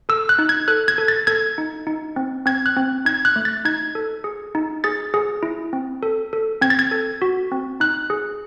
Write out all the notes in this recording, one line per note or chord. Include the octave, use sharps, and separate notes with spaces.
A4 E6
F#6
D#4
G#6
A4 F#6
G#6
A4
A6
A4 G#6
D#4
D#4
C4
C4 G#6
F#6
C4
D#4 G#6
F#6
A3
A6
D#4 G#6
A4
G#4
D#4
G#4 A6
G#4
E4
C4
A4
A4
C4 G#6
A6
G#6
A4
F#4
C4
D#4 F#6
G#4